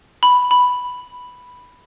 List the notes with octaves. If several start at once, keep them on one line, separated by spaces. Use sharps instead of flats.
B5
B5